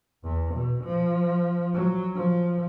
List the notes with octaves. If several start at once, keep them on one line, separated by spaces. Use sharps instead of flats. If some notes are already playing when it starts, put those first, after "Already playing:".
E2
B2
F3
F#3
F3